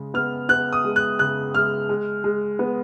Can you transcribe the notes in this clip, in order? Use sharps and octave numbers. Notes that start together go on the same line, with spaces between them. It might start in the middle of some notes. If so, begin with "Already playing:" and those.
Already playing: C#3 G#3
B3 F6
B3 F#6
D#6
G#3
F#6
C#3 F#6
G#3 F6
G#3
G#3
B3